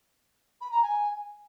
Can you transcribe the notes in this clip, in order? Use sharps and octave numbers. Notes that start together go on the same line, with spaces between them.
B5
A#5
G#5